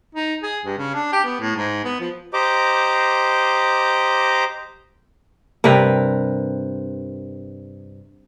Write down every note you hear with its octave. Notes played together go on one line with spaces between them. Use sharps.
D#4
G#4
G2
C#3
D4
G4
B3
A2
G#2
B3
F3
G4 C5 D#5 A#5 D6
G2 C3 A#4 B4